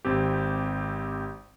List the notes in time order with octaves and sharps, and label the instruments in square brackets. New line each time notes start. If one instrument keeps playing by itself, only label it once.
[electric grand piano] G#1 C4 G4